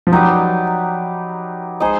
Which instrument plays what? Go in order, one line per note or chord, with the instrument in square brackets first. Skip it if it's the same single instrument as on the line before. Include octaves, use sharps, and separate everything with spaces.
[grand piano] F3
[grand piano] F#3 [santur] D#4 G4 B4 D5
[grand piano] G#3 [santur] D#4 G#4 C5 D#5